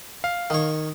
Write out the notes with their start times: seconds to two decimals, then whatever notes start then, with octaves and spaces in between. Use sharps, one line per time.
0.24 F5
0.50 D#3 C#5